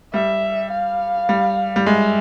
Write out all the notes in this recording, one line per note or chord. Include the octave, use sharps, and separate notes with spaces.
G3 E5
F5
G3
G3
G#3 E5